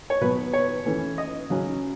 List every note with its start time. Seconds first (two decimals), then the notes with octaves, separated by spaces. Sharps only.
0.10 C#5
0.21 B2 F#3 B3 B4
0.53 C#5
0.86 E3 A3 C#4
1.18 D#5
1.50 C#3 F#3 C#4